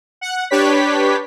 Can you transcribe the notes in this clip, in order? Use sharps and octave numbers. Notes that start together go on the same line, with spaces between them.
F#5
D4 G4 B4 C#5 B6